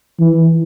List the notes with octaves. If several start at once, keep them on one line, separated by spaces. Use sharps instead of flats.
E3